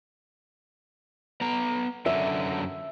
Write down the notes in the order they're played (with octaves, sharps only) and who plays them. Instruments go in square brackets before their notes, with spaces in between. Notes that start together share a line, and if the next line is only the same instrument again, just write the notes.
[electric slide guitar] B3 A#5
[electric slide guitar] F#2 D3 F#3 [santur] E5